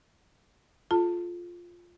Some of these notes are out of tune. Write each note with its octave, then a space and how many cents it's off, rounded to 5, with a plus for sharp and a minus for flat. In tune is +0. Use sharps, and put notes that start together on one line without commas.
F4 +0 A4 -35 A5 +25